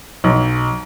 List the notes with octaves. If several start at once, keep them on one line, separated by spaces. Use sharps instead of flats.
B1